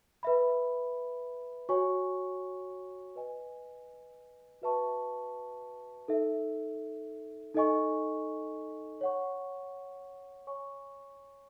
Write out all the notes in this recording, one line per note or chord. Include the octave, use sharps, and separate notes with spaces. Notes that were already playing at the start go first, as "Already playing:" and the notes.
B4 E5 B5
F#4 C#5 G#5 C#6
B4 D#5 G#5
F#4 B4 E5 A5 C#6
D#4 A4 E5
D#4 A4 D#5 G#5 C#6
C#5 F#5 C#6
C#5 G#5 C#6